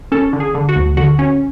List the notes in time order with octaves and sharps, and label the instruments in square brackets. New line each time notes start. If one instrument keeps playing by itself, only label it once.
[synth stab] C#4 A4
D3
G#4
D3
F#4
D2
D3 F#4
C#4